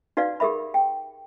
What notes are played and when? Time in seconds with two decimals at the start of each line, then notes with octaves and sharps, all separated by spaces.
0.17 D#4 F#4 B4 D5 F5
0.40 G4 G#4 A#4 E5 B5
0.74 G5